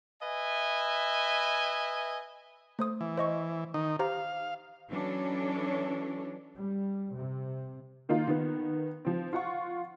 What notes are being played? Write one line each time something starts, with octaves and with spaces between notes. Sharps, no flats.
B4 D#5 E5 G#5
A3 C5 D#6
E3
C5 D#5 C#6
D#3 D#4
G4 C5 F5 A#5
E3 F#3 C#4 D4 A4 C#5
G3
C3
D#3 A#3 D#4 F4
D#3 B3
F3 C4
F4 F#5 C#6